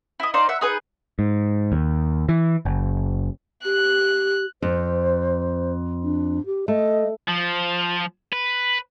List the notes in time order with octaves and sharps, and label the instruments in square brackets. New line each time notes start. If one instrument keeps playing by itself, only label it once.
[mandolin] E4 D#5
D#4 C5 D5 F5
E5 F#5
D#4 G#4 B4
[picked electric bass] G#2
D#2
E3
F#1
[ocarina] G4 [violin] F#6
[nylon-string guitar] F2 [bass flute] C5
[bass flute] D4
G4
[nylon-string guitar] A3 [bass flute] D#5
[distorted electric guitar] F3
B4